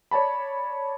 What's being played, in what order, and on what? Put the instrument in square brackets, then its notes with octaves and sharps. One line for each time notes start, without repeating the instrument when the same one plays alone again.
[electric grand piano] C#5 D5 A5 B5